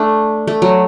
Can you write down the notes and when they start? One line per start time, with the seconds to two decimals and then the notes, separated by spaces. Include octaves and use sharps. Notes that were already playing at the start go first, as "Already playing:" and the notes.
Already playing: A3 D4
0.47 A3
0.62 F#3